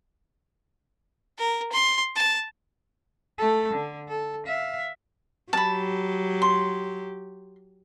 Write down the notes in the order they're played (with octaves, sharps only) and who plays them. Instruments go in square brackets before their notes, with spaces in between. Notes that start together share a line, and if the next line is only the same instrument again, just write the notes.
[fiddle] A#4
C6
A5
[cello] A3 A4
D3
A4
E5 F5
[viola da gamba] F#3 G4 [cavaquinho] A5 B5
[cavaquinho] C6